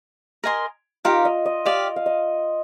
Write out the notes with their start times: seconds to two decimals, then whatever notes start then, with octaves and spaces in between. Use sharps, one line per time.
0.44 A#4 D#5 G#5 C6
1.05 D#4 F4 G4 A#4 F5
1.25 D#5
1.46 D#5
1.65 G4 D5 D#5 F5
1.96 F5
2.06 D#5